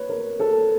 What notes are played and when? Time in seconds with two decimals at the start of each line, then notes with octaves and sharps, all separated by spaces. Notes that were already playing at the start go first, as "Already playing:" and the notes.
Already playing: B4 C#5
0.09 A#4
0.40 A4